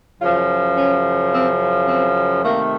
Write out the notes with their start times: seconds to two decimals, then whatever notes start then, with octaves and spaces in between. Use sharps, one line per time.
0.20 F#2 C#3 F3 F4
0.76 C#4
1.31 C4
1.87 C4
2.43 C3 D#3 A3 A#3